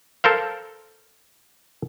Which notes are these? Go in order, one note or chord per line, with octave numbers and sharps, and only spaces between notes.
A4 A#4 C5 F5